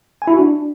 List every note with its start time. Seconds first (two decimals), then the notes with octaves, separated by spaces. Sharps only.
0.22 G#5
0.27 E4
0.33 F#4
0.39 D4